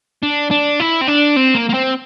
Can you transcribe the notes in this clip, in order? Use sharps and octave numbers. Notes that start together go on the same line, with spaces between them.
D4
D4
E4
C4
D4
C4
A#3
A#3
C4